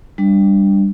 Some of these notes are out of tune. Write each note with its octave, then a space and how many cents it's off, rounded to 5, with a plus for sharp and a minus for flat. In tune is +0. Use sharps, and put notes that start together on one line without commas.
G3 +10 D4 +0